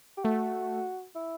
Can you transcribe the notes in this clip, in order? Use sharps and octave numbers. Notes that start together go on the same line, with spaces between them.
G4
A3 F#4
E4